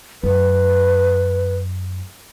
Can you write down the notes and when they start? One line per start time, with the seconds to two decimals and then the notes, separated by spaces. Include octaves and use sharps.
0.23 F#2 B4